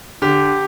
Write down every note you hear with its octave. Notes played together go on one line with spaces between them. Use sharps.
D3 G4